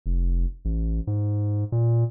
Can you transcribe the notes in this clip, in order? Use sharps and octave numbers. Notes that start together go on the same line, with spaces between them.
F1
A1
G#2
A#2